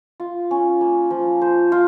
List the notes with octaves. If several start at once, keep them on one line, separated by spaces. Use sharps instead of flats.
F4
C#4
A#3
F3
C5
F4